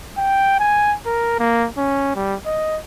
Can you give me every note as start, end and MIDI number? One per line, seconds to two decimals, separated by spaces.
0.17 0.59 79
0.60 0.95 80
1.06 1.38 70
1.39 1.67 58
1.78 2.13 61
2.15 2.35 55
2.46 2.78 75